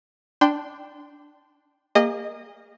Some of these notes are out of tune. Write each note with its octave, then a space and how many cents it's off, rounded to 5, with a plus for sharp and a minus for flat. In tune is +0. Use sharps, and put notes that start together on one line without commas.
D4 +0 G5 +0 C6 -25
A#3 +0 G#4 -45 D#5 -15